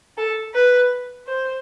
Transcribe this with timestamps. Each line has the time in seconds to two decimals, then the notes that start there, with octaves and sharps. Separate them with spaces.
0.17 A4
0.54 B4
1.27 C5